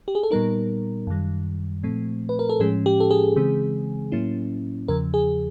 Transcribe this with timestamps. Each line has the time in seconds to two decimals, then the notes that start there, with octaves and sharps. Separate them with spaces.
0.08 G4
0.15 G#4
0.23 A4
0.31 A#2 G3 B3 D#4 A#4
1.07 F#2 D#3 G3
1.83 A#2 F3 A3 C4
2.29 B4
2.39 A#4
2.49 A4
2.60 A2 F3 G#3 C#4 G#4
2.86 G4
3.00 A4
3.11 G#4
3.36 C#3 E3 G#3 C4
4.12 A2 F#3 A#3 C#4 E4
4.88 E2 C#3 F3 A#4
5.14 G#4